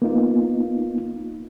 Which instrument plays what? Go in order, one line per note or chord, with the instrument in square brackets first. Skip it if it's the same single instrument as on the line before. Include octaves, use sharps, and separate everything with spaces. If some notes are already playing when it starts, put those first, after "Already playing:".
[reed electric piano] A#3 B3 D#4 F4